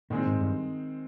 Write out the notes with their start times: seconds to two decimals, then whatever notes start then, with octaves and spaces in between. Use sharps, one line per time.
0.10 A#2 D#3 G#3 C4
0.26 G#2
0.41 G2